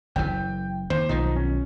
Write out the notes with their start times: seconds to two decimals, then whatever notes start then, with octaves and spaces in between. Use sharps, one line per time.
0.16 F#1 F#2 E3 G5
0.90 D#2 C5
1.09 B1 D#3 F3 D#4
1.36 C#4